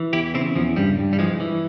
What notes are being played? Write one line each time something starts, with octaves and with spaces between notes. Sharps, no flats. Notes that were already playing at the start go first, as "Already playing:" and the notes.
Already playing: E3
E2 E4 G4
C#3 C4 E4
E2 F3
G2 G3
G2
G3
E3 F3 G#3
E3